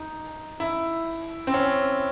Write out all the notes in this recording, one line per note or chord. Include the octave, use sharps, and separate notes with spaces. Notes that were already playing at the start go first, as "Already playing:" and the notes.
Already playing: D#4
E4
C4
C#4